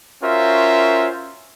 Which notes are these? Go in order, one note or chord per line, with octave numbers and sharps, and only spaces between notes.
C#4 F4 F#4 A#4 C5 E5